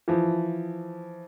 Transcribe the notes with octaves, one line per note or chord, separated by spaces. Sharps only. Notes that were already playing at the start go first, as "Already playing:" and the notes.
E3 F3